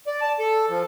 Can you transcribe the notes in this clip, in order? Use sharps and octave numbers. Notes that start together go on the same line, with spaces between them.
D5
A5
A4
F3